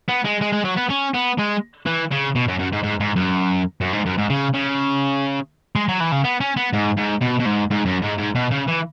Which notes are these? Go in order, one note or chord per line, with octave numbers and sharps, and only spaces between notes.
B3
G#3
G#3
G#3
F#3
B3
C#4
B3
G#3
E3
C#3
B2
F#2
F#2
G#2
G#2
G#2
F#2
F#2
G#2
F#2
G#2
C#3
C#3
G#3
F#3
E3
C#3
B3
C#4
B3
G#2
G#2
B2
B2
G#2
G#2
F#2
G#2
G#2
B2
C#3
E3